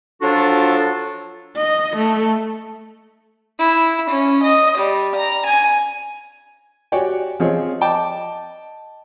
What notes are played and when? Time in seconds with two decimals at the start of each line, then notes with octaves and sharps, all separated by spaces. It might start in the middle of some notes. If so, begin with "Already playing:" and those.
0.22 F3 F#3 D4 F4 F#4 A4
1.57 D#5
1.97 A3
3.59 E4
4.11 C#4
4.45 D#5
4.79 G3
5.17 A#5
5.47 G#5
6.92 F#4 G4 C#5 D5 G5 G#5
7.40 F3 C4 G#4 C#5 D#5
7.81 D5 D#5 G5 A5 D6